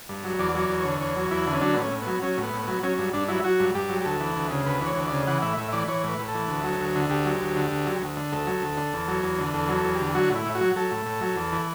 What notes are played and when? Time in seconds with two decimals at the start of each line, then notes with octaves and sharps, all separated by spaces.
0.09 G2
0.24 F#3
0.39 E2 D5
0.55 F#3 D5
0.69 E2
0.80 D3 C#5
1.00 E2 C#5
1.16 F#3
1.31 E2 E4
1.47 D3
1.53 C#4
1.61 F#3 D4
1.74 B3
1.77 A2 C#4
1.91 A2
2.02 F#3 B3
2.22 F#3 C#4
2.37 A2
2.43 B3
2.53 A2
2.63 F#3 B3
2.83 F#3 C#4
2.98 G2
3.13 G2 D4
3.28 F#3 E4
3.44 F#3 F#4
3.59 G2
3.74 G2 G4
3.89 F#3
4.01 G4
4.05 D2 A4
4.20 E3
4.36 D2
4.51 C#3
4.66 D2 B4
4.81 E3
4.86 C#5
4.96 D2
5.07 C#3 D5
5.27 E3 F#5
5.42 A2 E5
5.57 A2 E5
5.73 E3 D5
5.88 E3 C#5
6.04 A2 B4
6.19 A2
6.28 A4
6.34 E3
6.49 D2
6.64 F#3
6.80 D2
6.95 D3
7.10 D2 G4
7.25 F#3
7.41 D2
7.56 D3
7.71 D2
7.86 F#3
8.01 D2
8.17 D3
8.32 D2 A4
8.47 F#3
8.62 D2
8.77 D3
8.93 E2
9.08 F#3
9.23 E2
9.39 D3
9.54 E2 A4
9.69 F#3
9.75 A4
9.85 E2
9.95 D3 G4
10.15 F#3 F#4
10.30 A2
10.35 E4
10.46 A2
10.55 F#4
10.61 F#3
10.76 F#3 A4
10.91 A2
11.06 A2
11.21 F#3
11.36 E2
11.52 E3